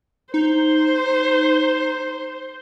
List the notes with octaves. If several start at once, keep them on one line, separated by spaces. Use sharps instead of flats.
D#4 C5